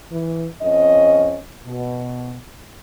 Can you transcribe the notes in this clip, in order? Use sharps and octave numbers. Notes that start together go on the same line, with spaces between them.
E3
F2 C#4 D#5
B2